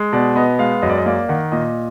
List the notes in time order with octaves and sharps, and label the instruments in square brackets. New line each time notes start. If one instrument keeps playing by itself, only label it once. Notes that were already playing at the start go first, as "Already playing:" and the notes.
Already playing: [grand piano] G#3
B2 D5
B3 D#5
G#3 F5
F#2 D#5
D5
D#5
A#3 D5
D#3 F#5
A#2 D#5